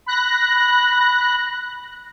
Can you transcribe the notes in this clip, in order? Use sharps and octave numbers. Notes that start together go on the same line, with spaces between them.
B5 F#6 A#6